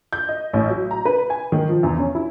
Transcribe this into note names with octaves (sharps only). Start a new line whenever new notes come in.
G6
D#5
A1
F#3
A#5
B4
G#5
D#3
F3
E2
C#4
E4